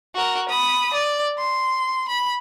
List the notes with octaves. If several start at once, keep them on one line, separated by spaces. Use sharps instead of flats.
F#4 A#4
B5 D#6
D5
C6
B5